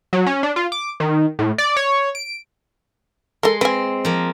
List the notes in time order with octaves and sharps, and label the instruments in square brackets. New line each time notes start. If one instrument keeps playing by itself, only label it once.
[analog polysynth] F#3
C#4
D4
F4
D6
D#3
A2
D5
C#5
D7
[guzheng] G#3 C6 [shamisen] A4 A#4
[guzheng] C4 [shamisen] B4 G#5
[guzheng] F3 A#3